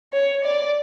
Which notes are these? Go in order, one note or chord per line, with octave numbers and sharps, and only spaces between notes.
C#5
D5